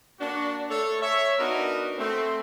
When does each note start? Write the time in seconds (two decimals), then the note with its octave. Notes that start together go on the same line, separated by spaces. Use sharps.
0.20 A#3 D4 F#4
0.69 A3 A4 C#5
1.02 C#5 E5
1.39 B3 D4 D#4 F#4 A#4 B4
1.98 A3 C4